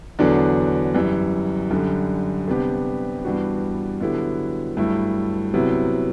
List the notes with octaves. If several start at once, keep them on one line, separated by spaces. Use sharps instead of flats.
E2 D3 F#3 B3 D4
F#2 E3 G3
F#2 D3 G3
C3 G3 B3 D4 G4
G2 E3 B3 D4 F#4
D3 F#3 B3 E4 G4
G2 F#3 A3 E4
C3 F#3 B3 E4